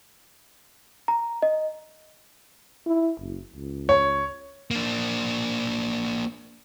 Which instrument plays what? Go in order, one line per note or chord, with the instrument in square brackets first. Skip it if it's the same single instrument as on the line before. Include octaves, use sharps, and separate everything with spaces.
[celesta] A#5
D#5
[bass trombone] E4
F#1
C#2
[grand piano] C#5
[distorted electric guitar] A#3 D4